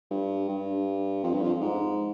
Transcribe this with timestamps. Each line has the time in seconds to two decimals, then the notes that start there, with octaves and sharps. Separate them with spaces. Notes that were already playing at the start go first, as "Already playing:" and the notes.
0.11 G2
0.48 G2
1.24 F2
1.33 G2
1.42 F2
1.61 G#2